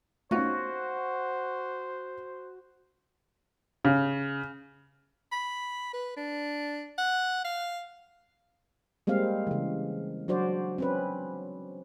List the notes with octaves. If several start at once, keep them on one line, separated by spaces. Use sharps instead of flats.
A3 B3 C#4 D#4 F4 F#4 C5
C#3
B5
B4
D4
F#5
F5
G3 G#3 A#3 C4 F5
C#3 E3
F#3 D4 F#4 C5 D5
C4 C#4 B4